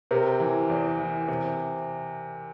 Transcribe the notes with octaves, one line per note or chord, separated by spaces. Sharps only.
C3 G4 A#4
E3
E2
E3
C3